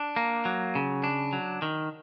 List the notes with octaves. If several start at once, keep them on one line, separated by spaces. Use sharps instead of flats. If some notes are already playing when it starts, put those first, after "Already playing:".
Already playing: D4
A#3
F#3
C#3
D4
F#3
D#3